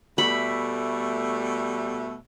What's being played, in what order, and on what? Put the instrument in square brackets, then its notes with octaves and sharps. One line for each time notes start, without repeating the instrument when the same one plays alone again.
[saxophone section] B2 G3 A3 [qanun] B5